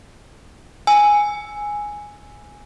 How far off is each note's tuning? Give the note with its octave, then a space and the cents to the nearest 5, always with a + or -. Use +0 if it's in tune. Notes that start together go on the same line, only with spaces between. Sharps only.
G#5 +0 E6 +0